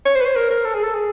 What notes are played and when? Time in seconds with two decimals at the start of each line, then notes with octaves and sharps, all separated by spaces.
0.06 C#5
0.15 C5
0.21 B4
0.26 C5
0.36 A#4
0.51 A#4
0.65 A4
0.74 G#4
0.84 A4
0.95 G#4